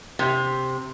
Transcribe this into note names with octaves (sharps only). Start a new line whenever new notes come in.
C3